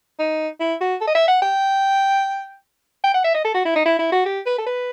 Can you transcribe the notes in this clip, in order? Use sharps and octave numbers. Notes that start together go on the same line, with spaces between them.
D#4
E4
F#4
A4
D#5
E5
F#5
G5
G5
F#5
E5
D#5
A4
F#4
E4
D#4
E4
E4
F#4
G4
B4
A4
B4